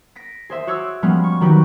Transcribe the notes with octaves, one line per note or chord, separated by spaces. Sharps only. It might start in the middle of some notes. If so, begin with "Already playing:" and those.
A#6 B6 D7
G#4 C5 E5
F#4 C5 C#5 D6 E6
F3 G3 G#3 B3 C#4
C#6
D#3 F#3 D#4 F#4 G4 B4